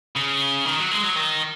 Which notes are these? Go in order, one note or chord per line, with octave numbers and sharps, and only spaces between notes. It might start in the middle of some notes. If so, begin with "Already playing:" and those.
C#3
D#3
F#3
G#3
F#3
D#3